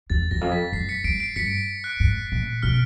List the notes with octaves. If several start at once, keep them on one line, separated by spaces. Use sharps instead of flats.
E2 A6
E2 A#6
F2
B6
F#2 C7
B6 C#7
G2 C7 D7
C7 D7
G2 B6 C#7
F#6
G#2
A#2
B2 F6